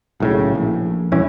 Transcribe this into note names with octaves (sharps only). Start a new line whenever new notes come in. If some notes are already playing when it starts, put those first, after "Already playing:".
B1 A2 C#3
A#1
E1 G2 E3 C#4